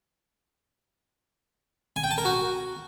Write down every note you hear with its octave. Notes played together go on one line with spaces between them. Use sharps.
G#5
G5
A5
A#4
F#4